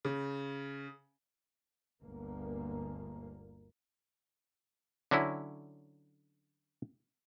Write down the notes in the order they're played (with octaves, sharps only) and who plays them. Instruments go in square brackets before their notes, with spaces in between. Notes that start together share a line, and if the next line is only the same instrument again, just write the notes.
[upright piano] C#3
[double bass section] G1 D2 A#3
[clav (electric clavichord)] D3 F#3 C#4 E4